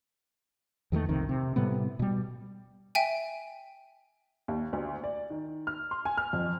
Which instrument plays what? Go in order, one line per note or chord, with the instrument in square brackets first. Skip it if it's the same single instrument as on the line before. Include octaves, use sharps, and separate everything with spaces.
[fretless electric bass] E2 D#3 F3 A3
B1 F2 C3 D#3
C3
A2 C3 G3 B3
B2 G3
[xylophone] E5 G5 G#5
[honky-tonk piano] D#2
D2
D5
D#3
F6
C6
G#5
F6
F2